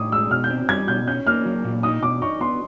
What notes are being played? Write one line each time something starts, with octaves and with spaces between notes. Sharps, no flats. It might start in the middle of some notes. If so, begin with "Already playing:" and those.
Already playing: A2 D6 D#6
G#3 E6
B2 F6
G6
C4
G3 G#6
B2 G6
C#4 G6
A#3 F6
F#3
A#2
D#4 D#6
B2 D6
D#4 C#6
B3 C6